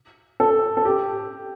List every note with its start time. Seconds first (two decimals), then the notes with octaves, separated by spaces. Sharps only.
0.40 A4
0.77 A4
0.85 G4